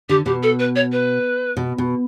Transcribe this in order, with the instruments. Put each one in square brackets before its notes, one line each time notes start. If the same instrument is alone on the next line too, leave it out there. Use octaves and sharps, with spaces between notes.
[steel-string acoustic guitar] D3 [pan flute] G4
[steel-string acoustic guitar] B2 [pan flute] G4
[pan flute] A4
B4
C#5
B4
[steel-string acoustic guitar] B2
B2